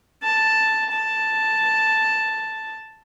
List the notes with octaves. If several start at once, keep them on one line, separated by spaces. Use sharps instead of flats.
A5
A5